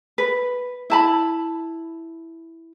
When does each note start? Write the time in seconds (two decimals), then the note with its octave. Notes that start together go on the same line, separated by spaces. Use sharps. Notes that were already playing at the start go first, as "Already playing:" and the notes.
0.18 B4
0.90 E4 A5 B5